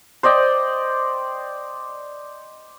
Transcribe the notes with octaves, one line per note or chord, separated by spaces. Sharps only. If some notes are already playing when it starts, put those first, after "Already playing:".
C5 D5 D#5 G5